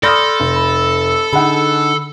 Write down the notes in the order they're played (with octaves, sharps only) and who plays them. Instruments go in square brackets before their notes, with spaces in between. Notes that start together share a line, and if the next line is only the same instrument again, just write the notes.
[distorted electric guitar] A4 [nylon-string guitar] D5 [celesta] B5 C6 G6 [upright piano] D#6 F6 A#6
[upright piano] F1
[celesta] B5
[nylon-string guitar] D3 D#4 [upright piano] G#4 F#5 [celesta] B5